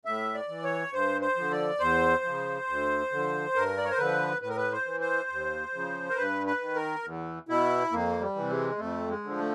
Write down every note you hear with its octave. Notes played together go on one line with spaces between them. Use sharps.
A2 E5
D5
E3
C#5
G2 C5
C5
D3 F3
D5
E2 C5
C#3 F3
D2
D3 F3
G2 A#4
D5
C#5
C5
D3 F3 B4
A2 B4
A#4
B4
C5
E3
C5
D#2
C#3 F3
A#4
G2 B4
B4
D#3
A#4
E2
B2 E4
F2 A#3
G3
C3 E3
G#3
F2 A3
G#3
D3 F3
A3